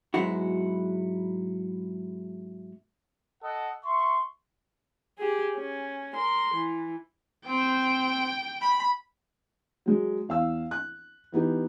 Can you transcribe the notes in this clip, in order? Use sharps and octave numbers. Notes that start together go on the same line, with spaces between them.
G#2 F#3 G#3 B3 E4 F#4
A4 D#5 F#5
E5 C6 C#6
G4 G#4
C#4
A#4 C6
E3
C4 G5
B5
F#3 G#3
E2 F5 E6
F#6
E3 B3 D#4 G4